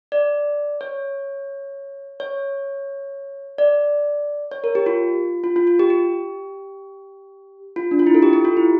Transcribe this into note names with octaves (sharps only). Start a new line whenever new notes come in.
D5
C#5
C#5
D5
C#5
A#4
G4
F4
F4
F4
F4
G4
G4
F4
D4
F4
E4
A4
G4
G4
F4
E4